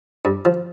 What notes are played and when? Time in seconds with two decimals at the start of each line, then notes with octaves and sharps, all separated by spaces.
0.25 G2
0.45 F3